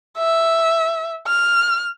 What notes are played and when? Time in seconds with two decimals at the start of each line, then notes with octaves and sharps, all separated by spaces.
0.18 E5
1.27 F6